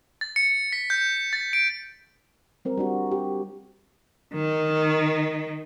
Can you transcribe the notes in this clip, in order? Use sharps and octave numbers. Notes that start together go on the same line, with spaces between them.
A6
C#7
B6
G6
A6
D7
G3 C4 A#4
G3 D4 F#4
G4
D#3